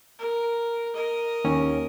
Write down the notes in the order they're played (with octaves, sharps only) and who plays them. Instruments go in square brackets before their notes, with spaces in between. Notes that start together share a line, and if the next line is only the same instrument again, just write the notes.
[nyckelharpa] A#4
A#4 D#5
[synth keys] D#2 C#4